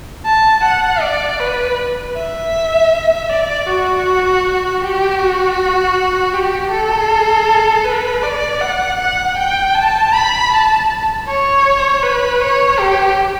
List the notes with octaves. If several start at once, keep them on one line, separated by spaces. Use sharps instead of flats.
A5
F#5
D5
B4
E5
D5
F#4
G4
F#4
G4
A4
B4
D5
F#5
F#5
G5
A5
B5
A5
C#5
B4
C#5
G4